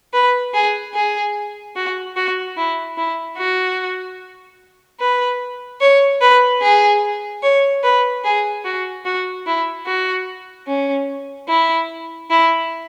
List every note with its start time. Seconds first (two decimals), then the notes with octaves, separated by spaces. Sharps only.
0.13 B4
0.54 G#4
0.94 G#4
1.75 F#4
2.16 F#4
2.57 E4
2.97 E4
3.38 F#4
5.00 B4
5.81 C#5
6.21 B4
6.62 G#4
7.43 C#5
7.83 B4
8.24 G#4
8.65 F#4
9.05 F#4
9.46 E4
9.86 F#4
10.67 C#4
11.48 E4
12.30 E4